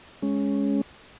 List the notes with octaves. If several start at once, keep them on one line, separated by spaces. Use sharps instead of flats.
G#3 C#4